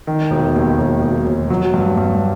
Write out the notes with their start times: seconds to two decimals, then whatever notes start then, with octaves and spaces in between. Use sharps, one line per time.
0.07 D#3
0.31 E1
0.55 D#2
0.78 E1
1.02 E1
1.26 E1
1.50 F#3
1.74 G2
1.97 G2